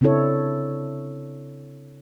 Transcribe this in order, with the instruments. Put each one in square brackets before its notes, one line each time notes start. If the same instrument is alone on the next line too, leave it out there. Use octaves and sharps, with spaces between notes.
[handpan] C#3 C4 D4 E4 A4 C#5